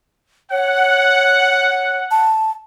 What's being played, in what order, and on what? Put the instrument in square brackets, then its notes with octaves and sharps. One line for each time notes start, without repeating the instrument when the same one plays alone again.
[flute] C#5 [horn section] F#5
[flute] A5